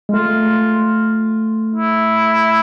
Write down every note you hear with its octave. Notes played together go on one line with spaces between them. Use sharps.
G#3
A3 F4
E4